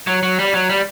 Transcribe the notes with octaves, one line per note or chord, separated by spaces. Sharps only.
F#3
F#3
G3
F#3
G3